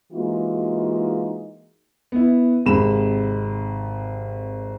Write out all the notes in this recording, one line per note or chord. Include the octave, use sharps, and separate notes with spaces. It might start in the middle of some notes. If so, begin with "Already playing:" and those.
E3 G#3 A#3 D#4 F4 F#4
B3 E4
G#1 C3 G#3 B5 E7